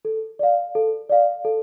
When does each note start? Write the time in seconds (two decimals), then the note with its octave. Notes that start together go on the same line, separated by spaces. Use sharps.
0.05 A4
0.39 D5 F5
0.75 A4
1.09 D5 F5
1.45 A4